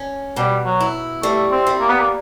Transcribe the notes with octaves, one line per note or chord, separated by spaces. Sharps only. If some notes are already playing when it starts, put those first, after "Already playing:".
Already playing: C#4
B2 G3
F#3
E4
G3 A3
C4
G3
A#3
B3
A#3